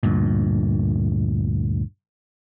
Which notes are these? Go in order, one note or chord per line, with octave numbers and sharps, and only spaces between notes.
D2 G2 A#2